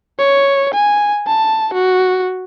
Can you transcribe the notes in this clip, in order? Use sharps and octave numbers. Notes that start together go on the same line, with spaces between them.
C#5
G#5
A5
F#4